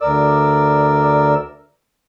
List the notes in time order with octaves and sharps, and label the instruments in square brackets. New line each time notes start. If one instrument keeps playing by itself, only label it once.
[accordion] D2 A#4 E6 [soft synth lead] D5